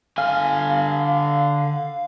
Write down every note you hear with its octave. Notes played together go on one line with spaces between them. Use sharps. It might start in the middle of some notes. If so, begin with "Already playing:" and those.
D3 F5 G#5